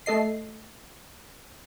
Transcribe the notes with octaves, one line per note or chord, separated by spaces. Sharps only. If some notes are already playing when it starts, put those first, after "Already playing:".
A3 A4 D#5 C7